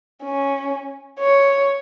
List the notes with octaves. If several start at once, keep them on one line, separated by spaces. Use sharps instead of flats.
C#4
C#5